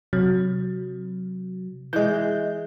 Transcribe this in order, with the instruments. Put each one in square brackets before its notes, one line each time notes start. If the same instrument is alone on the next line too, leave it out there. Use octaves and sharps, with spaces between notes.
[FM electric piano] C3 F#3
[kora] E3 G#3 [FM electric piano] D#5 G6